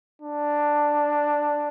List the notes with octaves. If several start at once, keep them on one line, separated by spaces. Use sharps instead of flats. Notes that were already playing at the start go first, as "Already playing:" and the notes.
D4